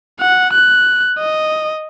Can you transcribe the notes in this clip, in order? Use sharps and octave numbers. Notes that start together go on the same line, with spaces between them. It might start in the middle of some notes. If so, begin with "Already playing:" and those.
F#5
F#6
D#5